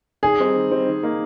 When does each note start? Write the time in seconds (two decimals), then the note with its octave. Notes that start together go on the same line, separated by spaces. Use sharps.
0.23 D#3 G#4
0.39 G3 C4 D#4
0.55 D#3
0.71 G3 C4 D#4
0.86 D#3
1.03 A#3 D#4